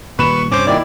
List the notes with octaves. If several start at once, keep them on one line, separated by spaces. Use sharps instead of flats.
A#2 D#3 G3 B4 B5 C#6 E7
G2 C3 C#4 C5 D6
A#2 D#3 E4 D5